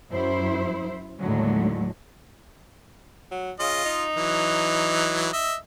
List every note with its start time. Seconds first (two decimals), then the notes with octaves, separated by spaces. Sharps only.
0.11 F#2 E4 C5
1.20 D#2 A2 D3 F#3 G#3
3.31 F#3
3.60 C#3 F4 D#5
3.85 D#4
4.16 E3 F#3
5.33 D#5 E5